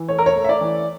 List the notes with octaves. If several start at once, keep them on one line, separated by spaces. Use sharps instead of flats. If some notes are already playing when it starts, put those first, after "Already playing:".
Already playing: E3
A3 C#5
A#4
C#5
A3
E5
D5
E3